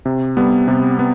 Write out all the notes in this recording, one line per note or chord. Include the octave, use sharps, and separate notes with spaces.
C3
G3 B3
C3
B3